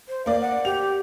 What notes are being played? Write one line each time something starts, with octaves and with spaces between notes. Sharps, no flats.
C5
A#3 D5 F5
F#5
G4 F7